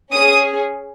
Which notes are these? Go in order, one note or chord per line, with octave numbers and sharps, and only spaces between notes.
C#4 G#4 D#6